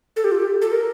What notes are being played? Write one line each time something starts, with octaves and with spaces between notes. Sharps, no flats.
A4
G4
F4
G4
A4
A#4